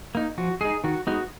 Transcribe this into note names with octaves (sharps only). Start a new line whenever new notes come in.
A#3 D#4
F3 F#4
G#3 D#4 G#4
D#3 F#4
G#3 B3 D#4 F#4